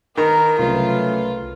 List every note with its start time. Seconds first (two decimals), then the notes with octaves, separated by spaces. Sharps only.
0.17 D#3 A#4 B4 A#5
0.59 C2 C#3 F#3 A3 C#4 F4 B4